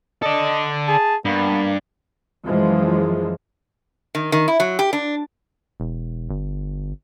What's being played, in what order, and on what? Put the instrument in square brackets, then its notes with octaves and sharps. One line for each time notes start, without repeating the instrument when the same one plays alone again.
[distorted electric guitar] A4 D5 [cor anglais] D#5
[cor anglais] G#4 [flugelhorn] A5
[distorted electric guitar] G2 [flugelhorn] A#3 [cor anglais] B3
[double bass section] F#2 E3 F3 G#3
[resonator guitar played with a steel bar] D#3
D#3
E4
F#3
G4
D4
[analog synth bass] E1
G1